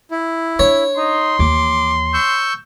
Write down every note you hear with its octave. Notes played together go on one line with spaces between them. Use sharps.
E4
D4 C#5
D#4 C6
D#2 E3 D6
C#6 E6 G6